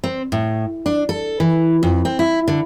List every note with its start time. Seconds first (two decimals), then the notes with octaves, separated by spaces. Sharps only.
0.04 C4
0.32 A2
0.86 D4
1.09 A4
1.40 E3
1.83 F2
2.05 C4
2.19 E4
2.48 D3